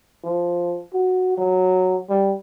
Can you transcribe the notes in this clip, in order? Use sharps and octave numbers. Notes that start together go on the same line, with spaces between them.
F3
F#4
F#3
G3